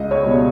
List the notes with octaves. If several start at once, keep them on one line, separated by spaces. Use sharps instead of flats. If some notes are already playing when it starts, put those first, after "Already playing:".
Already playing: C#2 D#5
C#5
B2 G3